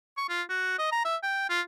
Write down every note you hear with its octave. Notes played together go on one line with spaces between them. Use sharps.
C#6
F4
F#4
D#5
A#5
E5
G5
F4